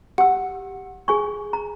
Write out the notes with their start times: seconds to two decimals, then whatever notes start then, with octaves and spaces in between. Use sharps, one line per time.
0.18 G4 F#5 E6
1.08 G#4 G#5 C#6
1.53 A#5